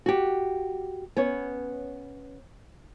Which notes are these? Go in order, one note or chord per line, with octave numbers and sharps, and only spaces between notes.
F#4 G4
B3 C#4 C#5